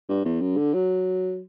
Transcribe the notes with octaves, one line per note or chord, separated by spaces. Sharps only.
G2
E2
F#2
D3
F#3